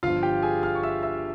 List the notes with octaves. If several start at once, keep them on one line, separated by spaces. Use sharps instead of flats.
G1 G2 F3 F4 F5
G4 G5
G#4 G#5
F5 F6
C#6
E5 E6
E5 E6